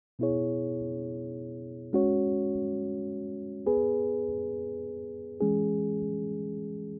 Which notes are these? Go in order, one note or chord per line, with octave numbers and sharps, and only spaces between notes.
B2 B3 E4 G#4 C#5
G#3 C#4 F#4 C#5
B3 G#4 B4
E3 G#3 C#4 G#4